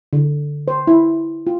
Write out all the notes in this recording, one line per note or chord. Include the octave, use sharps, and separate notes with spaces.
D3
C5
E4
F4